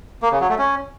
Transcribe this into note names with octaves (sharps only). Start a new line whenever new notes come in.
A#3
C#3
F#3
A3
C#4